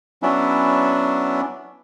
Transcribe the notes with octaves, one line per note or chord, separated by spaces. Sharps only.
F#3 B3 C#4 D4 E4